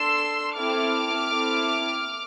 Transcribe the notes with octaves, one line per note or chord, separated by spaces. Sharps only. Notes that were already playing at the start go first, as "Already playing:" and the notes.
Already playing: D4 A4 C6 E6
C4 E4 A4 D6 F6
C4 E4 A4